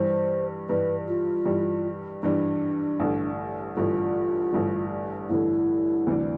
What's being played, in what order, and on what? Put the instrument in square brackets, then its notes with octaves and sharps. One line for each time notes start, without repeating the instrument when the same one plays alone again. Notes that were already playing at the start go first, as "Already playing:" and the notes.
Already playing: [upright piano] G2 E3 G3 [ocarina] C5
[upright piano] G2 E3 G3 [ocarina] B4
[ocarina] F4
[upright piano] G2 E3 G3
[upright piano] G2 E3 G3 [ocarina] D4
[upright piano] A1 G2 D3
[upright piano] A1 G2 D3 [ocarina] F4
[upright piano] A1 G2 D3
[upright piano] A1 G2 D3 [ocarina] E4
[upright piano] D2 C3 E3 G3 D4